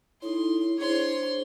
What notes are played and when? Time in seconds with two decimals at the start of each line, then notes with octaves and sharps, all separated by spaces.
0.22 D#4 E4 A4 C#5 C6
0.78 D4 G#4 C5 C#5 C6